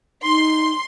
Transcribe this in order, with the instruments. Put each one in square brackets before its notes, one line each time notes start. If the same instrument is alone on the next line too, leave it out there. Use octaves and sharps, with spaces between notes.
[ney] D#4 [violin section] C6